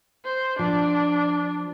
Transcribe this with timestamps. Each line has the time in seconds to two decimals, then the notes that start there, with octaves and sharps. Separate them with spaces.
0.25 C5
0.59 F3 D4